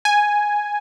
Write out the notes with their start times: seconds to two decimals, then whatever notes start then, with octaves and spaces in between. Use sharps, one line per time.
0.05 G#5